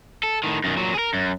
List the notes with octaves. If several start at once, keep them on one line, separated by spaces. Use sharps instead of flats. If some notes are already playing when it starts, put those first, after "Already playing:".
A4
A2 D#3
F#2 D#3
A#2 F#3
G#4 A#4
F#2